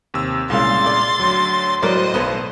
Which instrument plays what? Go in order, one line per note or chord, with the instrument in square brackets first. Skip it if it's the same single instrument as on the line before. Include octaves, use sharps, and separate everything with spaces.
[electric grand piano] D#2 C3 E6
[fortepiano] C2 F5 [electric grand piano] A#2 C#3 G#3 [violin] C6 A6
[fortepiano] D5
[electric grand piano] D2 F#3
[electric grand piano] A2 [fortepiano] F#3 A#4 D5 [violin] C5 D#5
[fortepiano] B1 B3